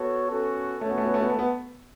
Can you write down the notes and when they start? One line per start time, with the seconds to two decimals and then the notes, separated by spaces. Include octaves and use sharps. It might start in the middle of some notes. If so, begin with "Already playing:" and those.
Already playing: B3 F#4 A4 C#5
0.29 C#4 F#4 A4
0.81 A3 C#4 F#4 C#5
0.89 B3
0.98 A3
1.05 B3
1.14 A3
1.22 B3
1.30 A3
1.39 B3